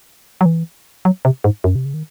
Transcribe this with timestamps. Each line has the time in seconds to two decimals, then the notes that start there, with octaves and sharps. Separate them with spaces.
0.41 F#3
0.46 E3
1.05 F#3
1.25 C3
1.44 G#2
1.64 F#2
1.75 C3
1.85 C#3
1.94 D#3